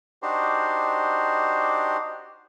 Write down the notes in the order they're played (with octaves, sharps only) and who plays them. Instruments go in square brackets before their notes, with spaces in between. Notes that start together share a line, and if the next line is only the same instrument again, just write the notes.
[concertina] D4 D#4 F#4 G4 C5